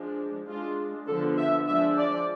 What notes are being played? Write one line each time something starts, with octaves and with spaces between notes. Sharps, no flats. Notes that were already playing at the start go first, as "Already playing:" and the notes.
Already playing: F3 G#3 D4
G#3 D4 F4
D3 F3 B3 D4 A4
E5
F3 G#3 D4 E5
D5